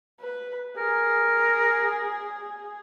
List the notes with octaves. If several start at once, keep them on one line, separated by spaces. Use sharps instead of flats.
B4
G#4 A#4